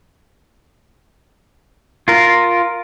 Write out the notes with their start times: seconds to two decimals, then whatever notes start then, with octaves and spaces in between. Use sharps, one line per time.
2.08 F4 A#4